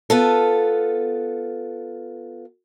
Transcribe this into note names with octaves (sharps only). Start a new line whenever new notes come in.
B3 F4 A4